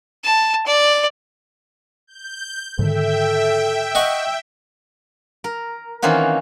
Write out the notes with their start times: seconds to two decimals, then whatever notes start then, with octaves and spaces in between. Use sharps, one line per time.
0.24 A5
0.66 D5
2.07 G6
2.79 G#2 D3 D#3 A4 E5 G5
3.95 D#5 F#5 C#6
5.44 A#4
6.02 D#3 E3 A#3 C4 C#4 F#4